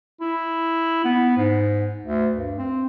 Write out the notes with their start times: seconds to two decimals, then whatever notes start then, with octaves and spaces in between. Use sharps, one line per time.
0.21 E4
1.04 B3
1.37 G#2
2.04 D2
2.36 G2
2.58 C4